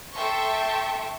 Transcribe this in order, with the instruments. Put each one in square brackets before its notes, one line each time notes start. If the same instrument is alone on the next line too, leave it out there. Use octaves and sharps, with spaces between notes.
[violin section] A4 E5 G5 A5 C6 C#6